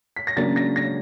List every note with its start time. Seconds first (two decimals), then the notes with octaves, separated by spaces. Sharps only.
0.16 B6
0.27 A#6
0.37 C#3 F#3 A#3 D4 A6
0.56 A#6
0.76 A#6